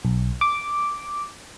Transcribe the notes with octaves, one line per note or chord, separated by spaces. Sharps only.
B1
D6